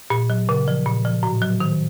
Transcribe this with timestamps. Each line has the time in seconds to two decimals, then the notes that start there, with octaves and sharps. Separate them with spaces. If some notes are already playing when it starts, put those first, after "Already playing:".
0.10 A#2
0.30 F#3
0.49 C#3
0.68 F3
0.86 A#2
1.05 F3
1.23 A2
1.42 F#3
1.60 D#3